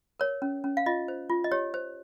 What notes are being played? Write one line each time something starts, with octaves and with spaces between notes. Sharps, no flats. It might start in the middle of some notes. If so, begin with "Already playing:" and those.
A#4 C#5
C#4
C#4
F5
F4 D#5
C5
F4
D#5
G4 C#5
C5